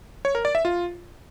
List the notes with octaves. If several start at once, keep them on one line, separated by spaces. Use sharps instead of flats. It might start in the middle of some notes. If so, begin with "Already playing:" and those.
C#5
A#4
D5
E5
F4